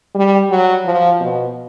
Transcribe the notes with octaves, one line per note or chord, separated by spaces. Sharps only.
G3
F#3
F3
B2